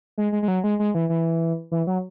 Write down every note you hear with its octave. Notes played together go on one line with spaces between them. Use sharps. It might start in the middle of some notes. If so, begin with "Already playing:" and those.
G#3
G#3
G#3
F#3
G#3
G#3
E3
E3
E3
F#3